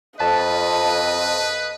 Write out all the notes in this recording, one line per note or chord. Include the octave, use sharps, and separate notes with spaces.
F2 B4 D#5 A5